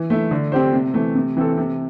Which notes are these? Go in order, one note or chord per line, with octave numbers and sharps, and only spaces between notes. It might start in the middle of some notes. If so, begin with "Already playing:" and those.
Already playing: E3
A3 E4
D3
C4 G4 C5
C3
E3 A3
C3
E3 C4 A4
C3